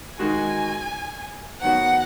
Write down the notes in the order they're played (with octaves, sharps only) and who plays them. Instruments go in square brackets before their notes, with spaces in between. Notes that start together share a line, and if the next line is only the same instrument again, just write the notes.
[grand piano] D#3 G#3 D#4 F#4 [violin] G#5
[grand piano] D#3 F#3 B3 F#4 [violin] F#5